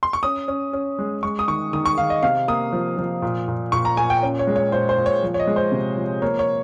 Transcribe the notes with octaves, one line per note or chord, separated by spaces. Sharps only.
C6
C#6
C#4 D#6
C#4
C#4
G#3
G#3 C#6
D#6
D#3 C#6
D#3 D#6
C#6
D#3 F5
D#5
C3 F5
A#3 D#6
F3
F3
A#2
A#2
A#2 C#6
A#5
A#2 G#5
G5
C#4
C#5
G#3
C#5
A#2 C5
C5
A#2
C#5
F3
C#5
D#5
G#3
C5
C3
F3
A#3 C#5
C#5